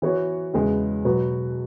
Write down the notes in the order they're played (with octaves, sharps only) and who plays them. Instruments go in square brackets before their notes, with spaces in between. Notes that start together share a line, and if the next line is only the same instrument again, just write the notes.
[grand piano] E3 B3 F#4 C#5
E2 C#3 G#3 B3
B2 F#3 B3 F#4 B4